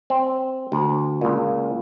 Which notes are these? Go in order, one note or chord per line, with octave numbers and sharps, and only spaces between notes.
C4
D2
C#2 A#2